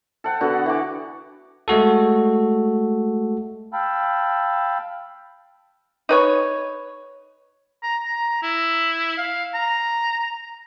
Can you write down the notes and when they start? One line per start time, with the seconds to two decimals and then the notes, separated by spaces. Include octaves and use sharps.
0.24 A4 F#5 G5
0.41 D3 B3 F#4
0.66 E3 D6
1.68 G#3 A3 F#4 A4
3.73 F5 G5 A5 B5 E6
6.09 D#4 B4 C#5
7.83 A#5
8.05 A#5
8.43 E4
9.18 F5
9.54 A#5